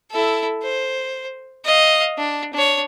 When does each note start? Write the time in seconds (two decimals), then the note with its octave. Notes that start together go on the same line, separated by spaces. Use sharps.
0.11 E4 A4
0.63 C5
1.65 D#5 F5
2.18 D4
2.54 D4 C#5